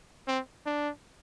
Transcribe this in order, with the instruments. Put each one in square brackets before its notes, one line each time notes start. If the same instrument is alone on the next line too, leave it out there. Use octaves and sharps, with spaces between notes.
[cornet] C4
D4